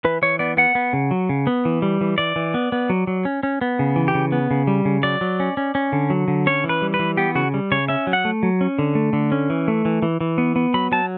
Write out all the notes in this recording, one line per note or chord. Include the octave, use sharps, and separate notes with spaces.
E3 B4
E3 C#5
B3 D5
B3 F#5
B3
C#3
F#3
C#3
B3
E3
G3
E3
E3 D5
E3
B3
B3
F#3
F#3
C#4
C#4
B3
C#3
E3
G4
C#3
B3
C#3
G3
C#3
F#3 D5
F#3
C#4
C#4
C#4
D3
F#3
D3
C#4 C#5
E3
B4
G3
B4
E3
B3 G4
C#3 F#4
G3
C#3 C#5
C#4 E5
F#3
F#5
A3
F#3
C#4
D3
A3
D3
C#4
E3
A3
E3
E3
E3
B3
B3
F#3 B5
F#3 A5